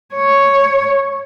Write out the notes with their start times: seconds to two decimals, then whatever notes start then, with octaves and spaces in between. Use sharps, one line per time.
0.14 C#5